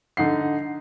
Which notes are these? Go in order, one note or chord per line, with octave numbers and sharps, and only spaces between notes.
D3 D#4 F#5 C7